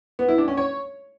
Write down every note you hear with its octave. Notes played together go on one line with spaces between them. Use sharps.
B3
E4
D4
C#4
C#5